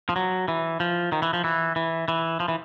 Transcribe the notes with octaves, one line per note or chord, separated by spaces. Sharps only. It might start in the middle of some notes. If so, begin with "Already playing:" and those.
F3
F#3
E3
F3
D#3
E3
F3
E3
E3
E3
F3
E3